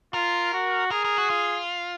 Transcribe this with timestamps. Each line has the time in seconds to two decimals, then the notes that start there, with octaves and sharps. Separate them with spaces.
0.14 F4 A#4
0.53 F#4
0.91 G#4 A#4
1.05 A#4
1.18 F#4
1.30 F4